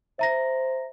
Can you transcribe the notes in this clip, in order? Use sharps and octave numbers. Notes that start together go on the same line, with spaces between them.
C5 E5 A#5 A#6